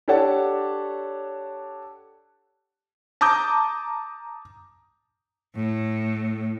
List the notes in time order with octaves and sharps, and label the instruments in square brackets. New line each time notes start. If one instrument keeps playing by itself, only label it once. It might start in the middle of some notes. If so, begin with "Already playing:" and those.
[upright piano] D4 G4 A4 C#5 F#5 A5
[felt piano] A5 A#5 D6 D#6 G6
[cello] A2